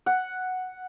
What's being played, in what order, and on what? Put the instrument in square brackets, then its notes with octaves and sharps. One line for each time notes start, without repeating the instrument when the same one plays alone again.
[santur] F#5